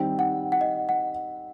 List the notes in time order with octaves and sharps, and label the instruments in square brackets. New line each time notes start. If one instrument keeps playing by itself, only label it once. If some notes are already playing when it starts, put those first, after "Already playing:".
Already playing: [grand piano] D#3 G3 C4 [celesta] G5
[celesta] F#5
F#5
D#5
F#5